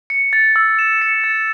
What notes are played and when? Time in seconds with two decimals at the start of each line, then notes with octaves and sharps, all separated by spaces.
0.10 C#7
0.33 A6
0.56 E6
0.79 E7
1.02 C#7
1.24 A6